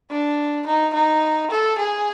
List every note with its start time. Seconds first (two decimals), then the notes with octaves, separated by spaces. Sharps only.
0.11 D4
0.67 D#4
0.94 D#4
1.51 A4
1.78 G#4